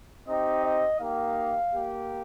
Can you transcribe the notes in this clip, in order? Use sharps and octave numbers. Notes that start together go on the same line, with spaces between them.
C4 D#4 G4 D#5
D#5
A#3 D#4 G4 F5
A#3 G4